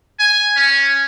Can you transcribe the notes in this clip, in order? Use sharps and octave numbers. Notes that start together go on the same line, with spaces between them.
G#5
C#4